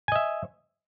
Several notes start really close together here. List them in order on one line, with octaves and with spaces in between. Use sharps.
G#5 D#5 E5